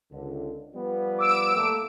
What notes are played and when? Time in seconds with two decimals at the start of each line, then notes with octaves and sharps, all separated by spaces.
0.11 C#2 D3
0.74 F3 G3 B3
1.19 D6 E6 D7
1.55 A2 A3 A#3